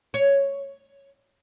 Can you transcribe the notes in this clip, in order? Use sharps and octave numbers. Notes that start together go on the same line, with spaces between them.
C#5